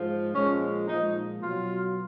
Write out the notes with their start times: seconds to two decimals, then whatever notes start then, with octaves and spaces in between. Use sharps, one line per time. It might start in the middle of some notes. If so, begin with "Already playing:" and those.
Already playing: G#2 F3 G#3
0.33 A#2 F3 G#3 C#4
0.87 A#2 F3 G#3 D#4
1.42 B2 F#3 F4